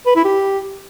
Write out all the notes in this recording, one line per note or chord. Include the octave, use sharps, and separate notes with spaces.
B4
E4
G4